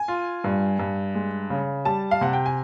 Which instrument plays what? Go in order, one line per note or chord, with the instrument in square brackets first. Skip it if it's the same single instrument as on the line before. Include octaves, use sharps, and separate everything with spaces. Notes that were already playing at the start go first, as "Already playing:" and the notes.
Already playing: [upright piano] G#5
[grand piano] F4
G2
G2
G#3
C#3
[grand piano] G3 [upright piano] A5
[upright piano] F5
[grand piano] C3 [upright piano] F#5
[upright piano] G5
G#5